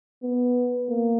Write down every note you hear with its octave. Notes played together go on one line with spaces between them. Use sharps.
B3
A#3